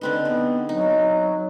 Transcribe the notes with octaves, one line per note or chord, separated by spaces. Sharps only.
D3 C4 D#4 B4
B3 G#4
F#3 D#4